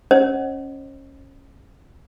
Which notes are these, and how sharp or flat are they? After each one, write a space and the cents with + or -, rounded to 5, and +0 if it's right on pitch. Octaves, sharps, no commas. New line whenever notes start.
C#4 -20 C5 +40 D#5 -35